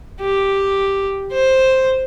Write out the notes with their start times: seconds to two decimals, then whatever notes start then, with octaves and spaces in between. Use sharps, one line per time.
0.20 G4
1.32 C5